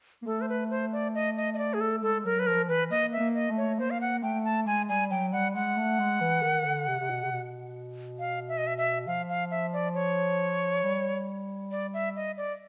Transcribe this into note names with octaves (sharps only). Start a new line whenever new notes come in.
A#3
A3 A4
C5
B4
C5
D5
D#5
D#5
D#5
D5
G#4
A4
G#3 A4
F#3 A#4
B4
F3 A#4
E3 B4
A#3 D#5
E5
A#3
D#5
A3
C#5
A#3 C5
F5
F#5
A3 G5
A5
G#3 G#5
G3 G#5
F#3 G5
G3 F#5
G#3 F#5
A3
G#3
E3
D#3
D3
C3
C3
B2
C3
B2
F5
E5
D#5
E5
E5
F3 F5
F5
E5
D5
C#5
G3
D5
E5
D#5
D5